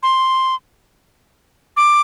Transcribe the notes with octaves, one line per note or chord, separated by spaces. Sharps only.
C6
D6